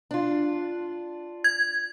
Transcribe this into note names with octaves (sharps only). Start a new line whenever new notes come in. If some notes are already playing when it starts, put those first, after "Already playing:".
D4 F4
G#6